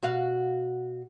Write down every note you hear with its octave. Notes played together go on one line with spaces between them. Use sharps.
B2 F#4 F5